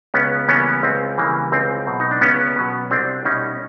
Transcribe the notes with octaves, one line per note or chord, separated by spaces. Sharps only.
C#2 B3 C#4
C#3 E3 G3 A#3 B3 C#4
C#2 C4
C#3 E3 G3 A#3
C#2 C4
B2 F#3 B3
D#4
D4
C#2 B3 C#4
B2 F#3 B3
C2 C4 D4
B2 G3 C#4 D#4